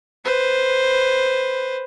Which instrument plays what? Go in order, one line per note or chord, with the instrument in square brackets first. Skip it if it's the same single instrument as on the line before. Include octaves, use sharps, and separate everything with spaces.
[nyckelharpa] B4 C5